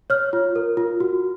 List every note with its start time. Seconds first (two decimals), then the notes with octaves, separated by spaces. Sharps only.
0.10 C#5 F6
0.33 F4
0.56 A#4
0.77 F4
1.00 F#4